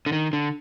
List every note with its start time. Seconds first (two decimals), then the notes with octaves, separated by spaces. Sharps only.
0.06 D3
0.12 D#3
0.33 D3